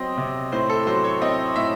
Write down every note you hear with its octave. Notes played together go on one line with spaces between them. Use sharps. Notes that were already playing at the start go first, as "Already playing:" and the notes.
Already playing: F#3 C4 D#5
C3
A2 C5
A4
F#3 C5
C#5
C4 D#5
A2 E5